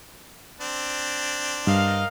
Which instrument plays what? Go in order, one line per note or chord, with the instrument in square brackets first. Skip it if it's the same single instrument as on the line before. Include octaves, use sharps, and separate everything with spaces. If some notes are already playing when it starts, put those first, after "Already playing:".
[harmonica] C4 D4
[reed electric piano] G2 [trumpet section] A#4 D#5 F5